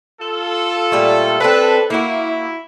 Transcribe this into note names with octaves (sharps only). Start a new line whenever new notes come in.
F4 A4
A#2 G3 A3
C4 D4 A4 B4
A#3 E4 F#4